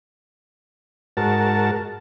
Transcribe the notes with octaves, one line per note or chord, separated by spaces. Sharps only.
G#2 F#4 A#4 A5